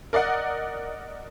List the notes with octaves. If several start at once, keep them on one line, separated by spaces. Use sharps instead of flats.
A#4 D5 D#5 F#5